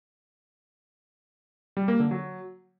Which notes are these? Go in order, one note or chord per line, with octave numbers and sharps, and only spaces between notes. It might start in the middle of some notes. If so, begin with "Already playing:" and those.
G3
A#3
D3
F#3